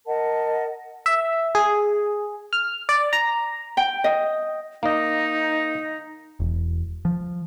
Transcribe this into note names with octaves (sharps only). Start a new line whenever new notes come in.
A#4 D#5 F#5 A5
E5
G#4
F6
D5
A#5
G5
D#5
A#3 D#4 D#5
E1
F3